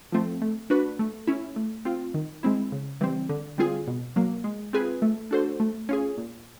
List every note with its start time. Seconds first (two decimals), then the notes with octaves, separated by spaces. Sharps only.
0.12 F3 A3 C4
0.42 A3
0.70 D4 F#4 B4
0.99 A3
1.27 C#4 E4
1.56 A3
1.85 C4 F4
2.14 D#3
2.43 G#3 C4 E4
2.72 C#3
3.01 E3 G3 C4
3.29 D3
3.58 G3 C4 F4 G#4
3.88 B2
4.16 F#3 A#3
4.44 G#3
4.73 C4 F4 G#4 B4
5.02 A3
5.31 D4 F#4 A4 C5
5.60 A3
5.89 C#4 F4 G#4
6.18 A#2